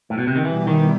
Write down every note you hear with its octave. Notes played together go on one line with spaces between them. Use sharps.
A2
B2
C3
D#3
B2 E3 G3 B3 E4 G4
D#3